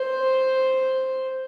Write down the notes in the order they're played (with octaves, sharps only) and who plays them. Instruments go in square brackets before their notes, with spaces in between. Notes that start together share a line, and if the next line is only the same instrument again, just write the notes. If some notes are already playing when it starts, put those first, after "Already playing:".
Already playing: [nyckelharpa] C5